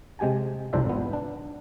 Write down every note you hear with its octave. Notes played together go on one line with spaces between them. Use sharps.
C3 G#3 G4 G#5 A5
C2 F2 D4 C5 D5 E5
G#1 B3
D4